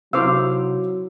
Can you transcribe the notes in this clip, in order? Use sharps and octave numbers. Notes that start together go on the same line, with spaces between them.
C3 F#3 D#4 E4 C5 F5 D6 E6